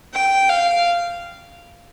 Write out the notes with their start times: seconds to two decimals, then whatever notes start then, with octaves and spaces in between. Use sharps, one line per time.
0.13 G5
0.49 F5